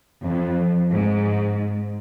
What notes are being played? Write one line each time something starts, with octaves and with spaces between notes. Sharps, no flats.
F2
G#2